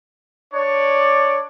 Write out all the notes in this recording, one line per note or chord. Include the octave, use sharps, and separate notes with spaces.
D4 C#5 D5